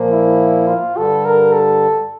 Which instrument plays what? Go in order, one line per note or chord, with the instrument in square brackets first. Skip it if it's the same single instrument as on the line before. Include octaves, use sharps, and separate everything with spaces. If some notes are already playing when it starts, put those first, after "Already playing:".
Already playing: [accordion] A#2 F3 A#3
[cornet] E4
F4
[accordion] G2 D3 G3 [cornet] A4
[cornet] A#4
A4